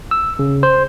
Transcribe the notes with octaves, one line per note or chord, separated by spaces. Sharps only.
E6
C#3
C5